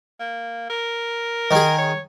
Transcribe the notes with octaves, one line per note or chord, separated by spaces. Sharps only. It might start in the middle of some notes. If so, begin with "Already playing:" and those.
A#3
A#4
D#3 G#4
C#5